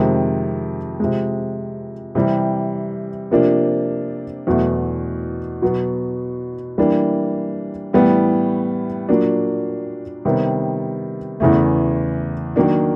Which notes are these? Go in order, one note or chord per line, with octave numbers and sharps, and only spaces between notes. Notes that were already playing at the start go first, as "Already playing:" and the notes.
Already playing: F2 C3 D#3 G#3
C3 F3 G#3
C3 E3 G3
C3 F3 A#3 D4
E2 B2 F#3 A3
B2 F#3 B3
E3 G3 A#3 D4
A2 E3 G3 B3
A#2 F#3 A#3 D4
C3 D#3 G3 B3
E2 C#3 E3 A3
D#3 F#3 A#3 D4